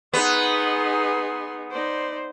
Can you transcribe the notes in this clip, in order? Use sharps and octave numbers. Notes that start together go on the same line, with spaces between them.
B3 D#4 G#4 B4 C6
D#4 C5 D5